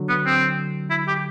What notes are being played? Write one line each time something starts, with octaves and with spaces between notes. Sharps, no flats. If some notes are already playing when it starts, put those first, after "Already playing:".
Already playing: D3 F#3
B3
C4
E4
G4